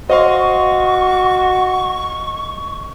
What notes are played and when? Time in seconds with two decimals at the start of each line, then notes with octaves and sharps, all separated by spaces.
0.10 F#4 C5 D#5 F5 C6 C#6